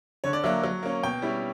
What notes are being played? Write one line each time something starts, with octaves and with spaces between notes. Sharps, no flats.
D3 C#5
D5
F#3 A#3 E5
F#3
A#3 C#4
B2 G5
G3 C#4 E4